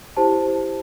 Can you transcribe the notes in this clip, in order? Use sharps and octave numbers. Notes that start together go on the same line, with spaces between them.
E4 G4 C5 A5